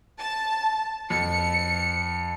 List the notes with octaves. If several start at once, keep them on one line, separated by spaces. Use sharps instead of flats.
A5
F2 C#7